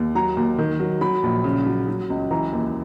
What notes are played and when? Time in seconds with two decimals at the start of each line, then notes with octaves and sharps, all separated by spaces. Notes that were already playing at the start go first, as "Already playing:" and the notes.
Already playing: D#2
0.15 F#3 A#5
0.37 D#2
0.58 D#3
0.80 F#3
1.01 F#3 B5
1.23 A#1
1.44 C#3
1.66 F#3
1.88 F#3
2.10 C#2
2.31 E3 A#5
2.53 D#2